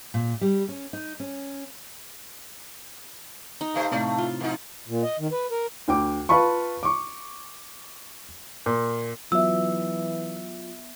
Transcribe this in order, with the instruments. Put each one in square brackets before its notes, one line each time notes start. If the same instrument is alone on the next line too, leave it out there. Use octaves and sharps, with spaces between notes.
[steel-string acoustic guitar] A#2
G3
C#4
D#4
C#4
[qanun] D#4
[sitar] C3 A3 C5
[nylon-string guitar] A2 C3 F5 [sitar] A3 D5
[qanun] F4
[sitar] F2 D#4
[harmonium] A#2
D#5
D#3
B4
A#4
[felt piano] D2 G5 D6
F4 B4 F5 A5 B5 C#6
C#6 D6
A#2
[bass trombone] E3 [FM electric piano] F#3 F4 [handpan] B3 E5 [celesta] E6